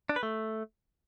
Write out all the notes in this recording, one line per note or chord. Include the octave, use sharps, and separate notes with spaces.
D4
B4
A3